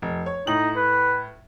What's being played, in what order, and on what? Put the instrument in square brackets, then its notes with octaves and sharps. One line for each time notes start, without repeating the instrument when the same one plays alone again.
[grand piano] F1
C#5
[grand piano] A2 F#7 [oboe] D#4
[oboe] B4